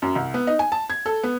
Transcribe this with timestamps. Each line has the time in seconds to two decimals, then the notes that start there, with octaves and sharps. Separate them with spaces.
0.02 F#2
0.16 C2
0.34 B3
0.47 D#4
0.59 G#5
0.72 A5
0.90 G#6
1.06 A4
1.23 B3